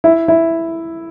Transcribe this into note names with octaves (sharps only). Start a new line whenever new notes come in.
E4
E4